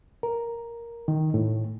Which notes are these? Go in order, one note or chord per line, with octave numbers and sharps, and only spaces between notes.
A#4
D#3
A2